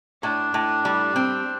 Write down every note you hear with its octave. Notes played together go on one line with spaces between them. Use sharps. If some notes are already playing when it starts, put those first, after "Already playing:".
A2 D4
A2
G3
C4